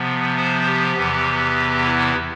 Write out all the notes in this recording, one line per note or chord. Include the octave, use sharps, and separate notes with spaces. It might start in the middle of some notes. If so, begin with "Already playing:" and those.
Already playing: C3 F3 B3
C5
G4
E2 C3 E3 B3
E4